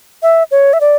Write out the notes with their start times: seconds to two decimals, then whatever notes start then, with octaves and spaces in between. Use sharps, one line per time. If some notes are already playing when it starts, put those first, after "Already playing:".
0.23 E5
0.51 C#5
0.73 E5
0.81 D5